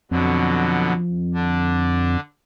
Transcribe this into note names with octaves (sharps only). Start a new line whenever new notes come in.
F2 B2 D3 F#3
D3 D4